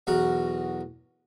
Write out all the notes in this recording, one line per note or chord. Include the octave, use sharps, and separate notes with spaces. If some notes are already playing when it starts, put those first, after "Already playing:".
B1 E2 F#4 A#4 F#5